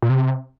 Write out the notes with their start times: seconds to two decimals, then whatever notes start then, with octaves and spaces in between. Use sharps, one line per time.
0.02 A#2
0.09 C3